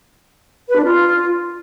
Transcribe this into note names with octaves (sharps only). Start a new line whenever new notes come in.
B4
D4
F4